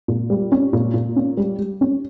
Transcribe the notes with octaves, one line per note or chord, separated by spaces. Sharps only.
A#2
G3
C#4
A#2
A#2
C#4
G3
G3
C#4